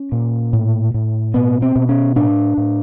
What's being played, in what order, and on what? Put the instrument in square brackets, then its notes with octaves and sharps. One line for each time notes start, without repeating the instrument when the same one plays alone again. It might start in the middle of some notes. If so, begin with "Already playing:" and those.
Already playing: [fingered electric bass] C#4
A#2
A2
A2
B2 B3
C4
B2
C#4
A2 D4
A2